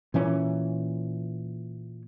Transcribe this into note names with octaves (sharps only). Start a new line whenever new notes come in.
A#2 E3 C#4